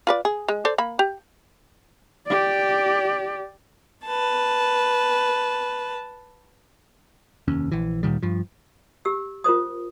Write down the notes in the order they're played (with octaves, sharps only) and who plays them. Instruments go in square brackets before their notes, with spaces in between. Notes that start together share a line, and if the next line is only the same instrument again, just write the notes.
[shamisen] F4 B4 D5
G#4
G#3
A4 C5 D5
A#3 B5
G4
[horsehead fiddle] G4 D5
[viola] B4 A5
[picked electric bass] F1 D#2 C#4
A#1 E3
D2 A#2 D#3 G3
G2 F3
[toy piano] G4 E6
F4 A#4 C5 D#6